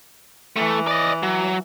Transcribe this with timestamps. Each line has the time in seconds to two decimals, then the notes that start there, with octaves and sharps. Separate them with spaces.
0.56 E3 A3
0.87 D5 D#5
1.23 F#3